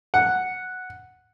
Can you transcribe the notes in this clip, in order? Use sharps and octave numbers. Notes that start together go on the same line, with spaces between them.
F#5